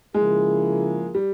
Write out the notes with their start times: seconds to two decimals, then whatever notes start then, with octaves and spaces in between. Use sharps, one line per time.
0.14 C#3 F3 G#3 A#3 E4 G#4
1.15 G3